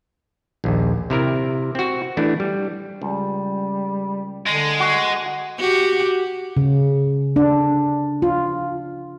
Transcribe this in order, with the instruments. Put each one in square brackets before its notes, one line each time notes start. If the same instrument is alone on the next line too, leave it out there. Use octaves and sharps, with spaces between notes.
[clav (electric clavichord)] A#1 D#2
C3 E4 A#4
C4 F#4
E3 A3 D4 E4
G3
[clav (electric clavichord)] C#2 [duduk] G3
[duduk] D3 [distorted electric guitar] G#3
[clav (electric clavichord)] F#4
[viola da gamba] F#4 G4
[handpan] C#3
D4
F4